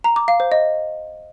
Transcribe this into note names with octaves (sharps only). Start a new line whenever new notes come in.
A#5
D6
F5
C5
D#5